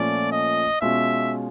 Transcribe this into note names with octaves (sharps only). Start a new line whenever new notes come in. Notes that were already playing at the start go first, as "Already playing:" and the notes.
Already playing: A#2 F3 A3 C#4 D5
D#5
B2 G#3 C#4 F4 E5